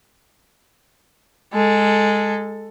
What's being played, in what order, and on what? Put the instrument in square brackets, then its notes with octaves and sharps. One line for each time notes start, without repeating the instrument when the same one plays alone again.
[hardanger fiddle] G#3 A4